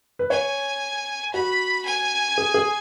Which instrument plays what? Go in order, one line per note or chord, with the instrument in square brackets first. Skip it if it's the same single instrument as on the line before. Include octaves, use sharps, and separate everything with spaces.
[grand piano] B4
[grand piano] C#5 [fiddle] G#5
[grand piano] F#4 [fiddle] B5
[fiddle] G#5
[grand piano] G#4
G#4